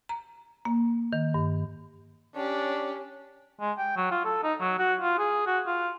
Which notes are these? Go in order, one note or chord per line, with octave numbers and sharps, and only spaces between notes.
A#5
A#3
D#3
G2
C#4 D4 G4
G#3
G5
F#3
F4
A4
D#4
F#3
F#4
F4
G#4
F#4
F4